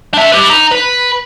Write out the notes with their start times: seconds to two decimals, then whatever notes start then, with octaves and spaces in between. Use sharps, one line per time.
0.14 D4 E5
0.32 G4 B4
0.50 D#4
0.71 B4